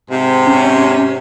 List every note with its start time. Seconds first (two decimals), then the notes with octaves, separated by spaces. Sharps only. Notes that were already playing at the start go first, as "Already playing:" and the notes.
0.10 G#2 C3
0.47 C#4